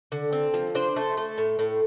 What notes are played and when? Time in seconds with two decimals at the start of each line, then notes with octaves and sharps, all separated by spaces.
0.12 D3
0.32 C4
0.54 F3
0.75 D4 C5
0.96 A3
1.17 A3
1.38 A2
1.59 A2